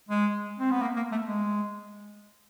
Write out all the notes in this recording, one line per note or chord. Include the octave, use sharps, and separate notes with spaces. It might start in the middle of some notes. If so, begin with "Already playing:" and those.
G#3
C4
B3
A#3
A#3
A3
G#3